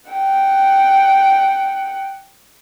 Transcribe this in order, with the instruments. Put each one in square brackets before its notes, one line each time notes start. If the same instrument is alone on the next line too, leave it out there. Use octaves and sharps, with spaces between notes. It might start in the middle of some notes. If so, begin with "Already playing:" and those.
[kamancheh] F#5 G5